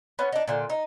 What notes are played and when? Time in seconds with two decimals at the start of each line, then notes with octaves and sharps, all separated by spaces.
0.19 B3 C#4
0.32 D4 D#4
0.48 A#2 D3
0.70 D#4